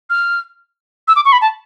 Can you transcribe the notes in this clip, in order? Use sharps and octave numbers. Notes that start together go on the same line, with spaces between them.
F6
E6
D6
C#6
B5
A5